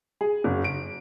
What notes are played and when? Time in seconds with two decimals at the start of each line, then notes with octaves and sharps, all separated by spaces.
0.21 G#4
0.44 F#1
0.64 D7